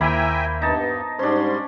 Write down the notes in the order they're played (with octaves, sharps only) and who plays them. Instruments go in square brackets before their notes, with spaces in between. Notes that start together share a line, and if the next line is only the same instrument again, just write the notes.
[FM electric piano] D#2 B5 [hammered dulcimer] A#3 E4 C5 [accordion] E5 G5 G#5
[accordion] G2 B3 [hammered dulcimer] D#4 A5
[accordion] G#2 G3 C6 [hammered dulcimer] C#4 D4 [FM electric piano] C5